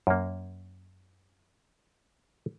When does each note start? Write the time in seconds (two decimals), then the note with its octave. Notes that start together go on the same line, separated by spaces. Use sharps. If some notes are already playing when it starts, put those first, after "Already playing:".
0.07 F#2 A#3